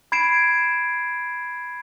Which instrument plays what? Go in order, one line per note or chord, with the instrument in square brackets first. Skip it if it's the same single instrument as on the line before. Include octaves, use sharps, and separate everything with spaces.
[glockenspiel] B5 G#6 C7 D7 E7